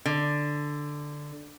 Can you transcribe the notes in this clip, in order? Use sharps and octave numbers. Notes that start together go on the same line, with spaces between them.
D3